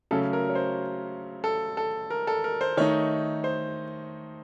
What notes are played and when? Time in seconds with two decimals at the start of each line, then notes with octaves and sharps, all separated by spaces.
0.11 C#3 F#3 A3 C#4 A4
0.33 A#4
0.50 C#5
0.55 C5
1.44 A4
1.77 A4
2.10 A#4
2.27 A4
2.44 A#4
2.61 C5
2.77 D#3 A3 D#4 C#5
3.44 C5